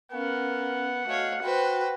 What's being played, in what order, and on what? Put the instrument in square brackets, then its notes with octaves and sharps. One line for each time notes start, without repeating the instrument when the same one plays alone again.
[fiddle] B3 [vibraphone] C#4 F5 G#5 [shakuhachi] A#4 [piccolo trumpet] F#5
[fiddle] A3 C#5 [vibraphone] F#4 D#5 G#5 [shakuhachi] F5
[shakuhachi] F#4 [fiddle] B4 C5 [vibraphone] G5